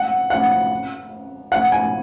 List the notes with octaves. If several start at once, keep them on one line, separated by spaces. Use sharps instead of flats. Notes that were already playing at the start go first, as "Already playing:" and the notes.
Already playing: F#5
F#5
F#5
G#5